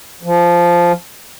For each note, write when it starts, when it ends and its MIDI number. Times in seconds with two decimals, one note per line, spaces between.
0.23 0.92 53